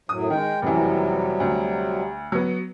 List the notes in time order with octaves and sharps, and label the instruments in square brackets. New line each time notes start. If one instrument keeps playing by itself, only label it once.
[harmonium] F#2 A2 F#3 [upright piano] D#6
[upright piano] D#3 [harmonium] G#3 G5
[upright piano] F1 F#2 E3 [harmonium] C3 F#3 G3
[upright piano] D2
F#3 B3